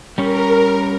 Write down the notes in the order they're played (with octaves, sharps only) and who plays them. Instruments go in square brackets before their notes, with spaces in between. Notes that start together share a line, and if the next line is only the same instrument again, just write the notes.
[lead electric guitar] G3 C#4 [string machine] A#4